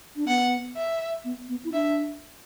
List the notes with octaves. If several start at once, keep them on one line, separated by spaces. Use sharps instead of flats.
D4
B3 F#5
E5
B3
B3
E4
D4 E5